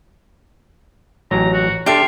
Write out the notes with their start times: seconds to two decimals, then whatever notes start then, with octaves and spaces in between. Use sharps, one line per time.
1.31 A1 F#3 A#5
1.53 F#4
1.86 D4 F4 G4 A4 E5